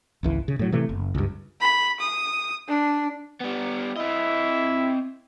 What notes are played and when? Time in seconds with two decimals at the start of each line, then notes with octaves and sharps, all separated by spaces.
0.23 G#1 C#2 E3
0.48 C#3
0.59 A2 F#3
0.72 C3 E3 A3
0.89 F#1
1.15 C#2 G2
1.61 B5
2.00 D#6
2.68 D4
3.40 G3 B3
3.96 C4 E4 D#5